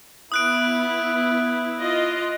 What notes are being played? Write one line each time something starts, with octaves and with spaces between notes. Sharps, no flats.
B3 E4 D#6 F#6 D7
F4 D#5